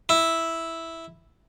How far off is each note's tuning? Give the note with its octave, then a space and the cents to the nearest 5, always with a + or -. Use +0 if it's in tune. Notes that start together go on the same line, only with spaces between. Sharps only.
E4 -5